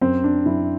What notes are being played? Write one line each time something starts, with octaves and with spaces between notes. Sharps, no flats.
F#2 C4
D4
F#2 E4